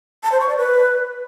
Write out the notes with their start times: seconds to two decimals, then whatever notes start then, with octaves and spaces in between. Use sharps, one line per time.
0.23 A5
0.32 C5
0.40 C#6
0.49 D5
0.57 B4